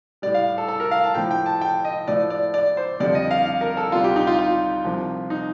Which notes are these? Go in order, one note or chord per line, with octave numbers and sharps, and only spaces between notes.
A2 G3 D5
F5
A4
A4
A#4
F5
A5
A2 F3 A3 G5
G5
A5
G5
D#5
A2 F3 A3 D5
D5
D5
C5
F2 D3 G3 D5
D#5
F5
F5
A#4
A4
D2 C3 G3 F4
G4
D#4
F4
F4
C2 C3 F3
D#4